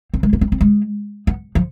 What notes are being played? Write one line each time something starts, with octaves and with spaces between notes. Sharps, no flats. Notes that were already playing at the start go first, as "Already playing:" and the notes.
C4
G#3
B3
C4
C4
G#3
B3
F3